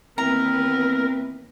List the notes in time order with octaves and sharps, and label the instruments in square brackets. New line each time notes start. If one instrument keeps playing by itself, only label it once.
[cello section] D#2 B3 B4 [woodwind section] E3 C4 [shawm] A#4 [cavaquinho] A#5